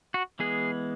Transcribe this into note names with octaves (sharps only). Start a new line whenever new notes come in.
F#4
E3 G#3 B3 G#4